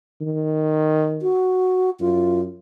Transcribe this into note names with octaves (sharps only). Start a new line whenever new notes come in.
D#3
F#4
F#2 F4